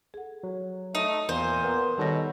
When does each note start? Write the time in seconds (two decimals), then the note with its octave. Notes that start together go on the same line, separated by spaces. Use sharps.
0.14 G#4 A4 F#5
0.43 F#3
0.95 A3 D#4
1.29 E2 A#2 C5
1.63 B3 A#4
1.98 B2 D#3 G3 D#4 A4 C#5 A#6